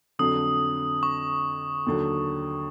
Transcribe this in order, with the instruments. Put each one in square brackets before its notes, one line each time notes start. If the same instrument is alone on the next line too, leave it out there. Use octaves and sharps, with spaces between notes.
[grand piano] F2 D3 F#3 [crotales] D#6
[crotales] C#6
[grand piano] D#2 D3 F#3